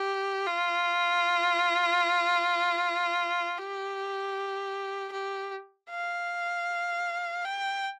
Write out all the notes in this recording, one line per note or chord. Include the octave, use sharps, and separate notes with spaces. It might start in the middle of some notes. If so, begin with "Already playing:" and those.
Already playing: G4
F4
G4
G4
F5
G5